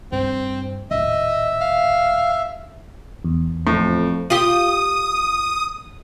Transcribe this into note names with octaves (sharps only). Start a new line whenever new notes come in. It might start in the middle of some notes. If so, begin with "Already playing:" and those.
G2 C4
D#1 A2 D#5 E5
F5
E2
F2 A2
F4 G4 D#6